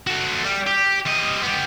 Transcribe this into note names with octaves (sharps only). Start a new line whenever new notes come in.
F#4 A4
G3
G4
G3 D#5
B3 G4